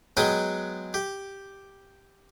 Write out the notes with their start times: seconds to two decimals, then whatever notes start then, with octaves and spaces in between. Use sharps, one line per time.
0.17 F#3 G#3 B3 G5 D#6
0.94 G4